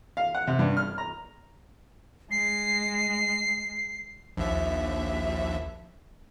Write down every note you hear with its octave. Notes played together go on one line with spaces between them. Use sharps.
F5
F#5
C3
G2
F6
A#5
G#3 C7
A#1 D#2 E5